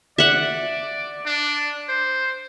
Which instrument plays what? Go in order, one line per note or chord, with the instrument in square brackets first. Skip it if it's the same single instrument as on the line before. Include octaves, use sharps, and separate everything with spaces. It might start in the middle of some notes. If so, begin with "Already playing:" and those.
[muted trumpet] D5 [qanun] E5 F#5
[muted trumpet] D4
C5